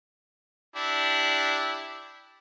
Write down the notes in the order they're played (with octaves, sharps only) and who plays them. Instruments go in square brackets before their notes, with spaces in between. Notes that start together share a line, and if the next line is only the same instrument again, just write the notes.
[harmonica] D4 E4 G4